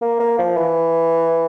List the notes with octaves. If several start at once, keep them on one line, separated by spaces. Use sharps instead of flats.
A#3
A#3
F3
E3